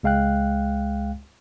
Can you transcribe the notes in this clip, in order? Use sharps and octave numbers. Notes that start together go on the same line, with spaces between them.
C#2 G#3 F5 G5 F#6